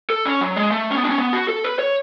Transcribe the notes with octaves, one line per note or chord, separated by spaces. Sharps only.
A4
C#4
F#3
G#3
A3
C#4
B3
D4
C#4
B3
F#4
A4
B4
C#5